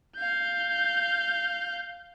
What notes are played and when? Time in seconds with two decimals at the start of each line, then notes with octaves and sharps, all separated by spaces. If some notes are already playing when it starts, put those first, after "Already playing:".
0.17 F5 G6